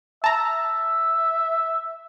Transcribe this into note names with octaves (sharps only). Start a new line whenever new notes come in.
E5 A5 A#5